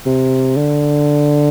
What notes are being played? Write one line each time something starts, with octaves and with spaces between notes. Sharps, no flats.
C3
D3